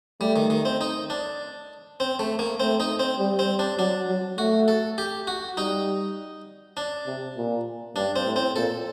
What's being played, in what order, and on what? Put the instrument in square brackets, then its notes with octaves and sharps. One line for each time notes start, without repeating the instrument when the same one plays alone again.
[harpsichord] G3 [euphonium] A3
[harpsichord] D#3
D#3
C4
D#4
D4
C4
A3
A#3
[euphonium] A3 [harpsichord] C4
[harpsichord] D#4
C4
[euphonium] G3
[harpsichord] C4
D4
[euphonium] F#3 [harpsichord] D4
[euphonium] F#3
[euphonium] A3 [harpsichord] F#4
[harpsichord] A4
G4
F#4
[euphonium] G3 [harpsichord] D#4
[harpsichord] D4
[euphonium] C3
A#2
[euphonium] G2 [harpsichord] D4
[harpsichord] C4
[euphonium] A2
[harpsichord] C4
[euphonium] A#2 [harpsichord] A4